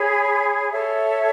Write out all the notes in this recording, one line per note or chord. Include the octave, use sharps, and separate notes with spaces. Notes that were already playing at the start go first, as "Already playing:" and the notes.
Already playing: G#4 C#5 G#5 B5
A4 C#5 E5